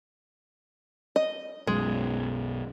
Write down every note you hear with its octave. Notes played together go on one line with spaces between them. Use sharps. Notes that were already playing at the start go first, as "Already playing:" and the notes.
D#5
B1 F#2 G#3